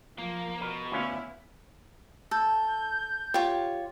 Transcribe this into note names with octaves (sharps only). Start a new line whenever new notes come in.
F3 A#3
B2 A#4
D2 B3 C#4 E4 F5
A4 G6
F4 G4 C#5